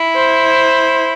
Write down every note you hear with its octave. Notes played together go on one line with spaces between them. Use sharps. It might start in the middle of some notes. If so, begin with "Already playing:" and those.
Already playing: E4
C5